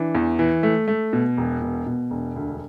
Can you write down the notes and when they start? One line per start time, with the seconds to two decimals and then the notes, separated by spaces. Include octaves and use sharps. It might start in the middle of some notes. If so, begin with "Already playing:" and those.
Already playing: E3 D4
0.15 E2
0.39 E3
0.63 A3
0.88 A3
1.13 B2
1.37 E1
1.62 B2
1.86 B2
2.10 E1
2.36 D2